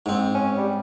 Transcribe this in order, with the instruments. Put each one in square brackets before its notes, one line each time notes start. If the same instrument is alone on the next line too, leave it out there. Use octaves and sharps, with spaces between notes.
[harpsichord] G#2 C4
[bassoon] C#4
G3